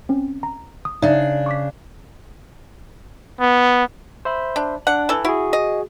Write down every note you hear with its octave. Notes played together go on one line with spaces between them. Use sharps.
C4 C#4
A#5
D#6
C#3 D4 D#4 D5 E5
C#6 D6 B6
B3
C5 E5 B5
D4
D4 F#5
E3 A4
E4 F#4 G#4
D#5